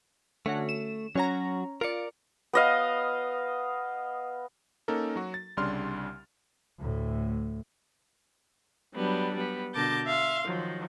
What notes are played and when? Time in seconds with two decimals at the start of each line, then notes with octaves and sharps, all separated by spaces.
0.46 D3 A3 C#4 F#4
0.69 E7
1.16 F#3 C#4 F#4 C#5 A#5
1.81 F4 A#4 D5 C#7
2.53 B3 D#5 F5
4.88 A#3 C#4 D#4 A4 A#4
5.16 F#3 F#4
5.34 A6
5.57 C2 C#3 G3 D4 C6 F6
6.79 D2 A2
8.95 F#3 G3 B3 D4
9.35 G3 B3
9.74 B2 D3 A#4 A5 D6 G6
10.06 E5 F5 C6
10.47 D#3 F3 F#3